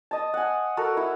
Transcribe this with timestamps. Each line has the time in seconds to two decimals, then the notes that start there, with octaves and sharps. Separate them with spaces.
0.11 D#5 A5
0.34 F#5 G#5
0.77 F#4 A4 A#4
0.97 E4